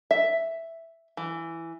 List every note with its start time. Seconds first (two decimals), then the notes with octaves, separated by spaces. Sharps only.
0.11 E5
1.17 E3